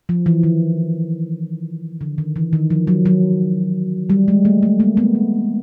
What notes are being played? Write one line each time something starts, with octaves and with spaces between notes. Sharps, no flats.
F3
E3
D#3
D3
D#3
E3
D#3
F3
F#3
F#3
G3
G#3
A3
A3
G#3 A#3
A3 B3
G3